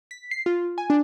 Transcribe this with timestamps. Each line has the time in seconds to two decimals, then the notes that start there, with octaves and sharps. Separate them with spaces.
0.11 B6
0.31 C7
0.46 F4
0.78 G#5
0.90 D4